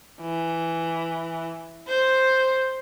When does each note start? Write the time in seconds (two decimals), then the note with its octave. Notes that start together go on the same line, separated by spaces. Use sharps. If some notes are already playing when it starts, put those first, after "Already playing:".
0.21 E3
1.88 C5